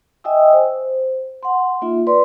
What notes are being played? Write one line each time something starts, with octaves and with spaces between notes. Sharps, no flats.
D#5 E5 G5 G#5 D#6 E6
C5
F#5 C6
A#3 D#4 F4 E5
B4 D5 C6